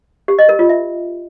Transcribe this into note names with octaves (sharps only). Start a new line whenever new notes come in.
G4
D#5
A#4
F4
E5